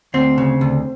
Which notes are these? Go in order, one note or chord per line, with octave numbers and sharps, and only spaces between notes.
D2 C4
C#3
D2